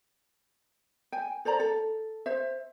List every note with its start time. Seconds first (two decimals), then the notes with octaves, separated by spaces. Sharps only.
1.12 G5 G#5
1.45 A4 C5 D5 A#5
1.60 A4
2.26 C5 E5